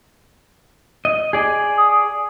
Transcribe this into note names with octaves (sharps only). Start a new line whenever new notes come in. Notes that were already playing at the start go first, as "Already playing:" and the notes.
D#5
G#4 D5
D#6